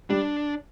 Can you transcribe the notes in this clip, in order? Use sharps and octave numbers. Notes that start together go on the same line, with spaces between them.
G3 D4